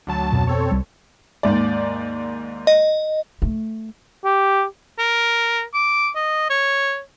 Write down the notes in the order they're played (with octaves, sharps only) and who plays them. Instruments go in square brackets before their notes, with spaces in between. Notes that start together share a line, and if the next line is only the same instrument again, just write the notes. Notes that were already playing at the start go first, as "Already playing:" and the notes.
[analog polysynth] D2 F#3 A5
[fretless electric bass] F2 B2
[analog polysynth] C4 A4 C#5
[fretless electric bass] C2 G3
[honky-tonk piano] D#2 G#2 D5
[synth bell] D#5
[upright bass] A3
[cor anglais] G4
[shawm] A#4
D6
D#5
C#5